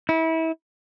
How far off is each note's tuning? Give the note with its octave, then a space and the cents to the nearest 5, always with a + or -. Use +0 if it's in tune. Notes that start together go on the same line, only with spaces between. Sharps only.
E4 -30